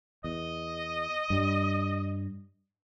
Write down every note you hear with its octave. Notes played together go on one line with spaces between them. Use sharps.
E2 D#5
G2 G3